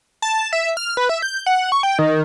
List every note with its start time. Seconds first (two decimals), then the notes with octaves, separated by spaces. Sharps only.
0.22 A5
0.53 E5
0.77 F6
0.97 B4
1.09 E5
1.22 G6
1.46 F#5
1.72 C#6
1.83 G5
1.99 D#3